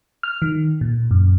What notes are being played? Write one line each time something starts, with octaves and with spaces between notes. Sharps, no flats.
F6
D#3
A#2
F#2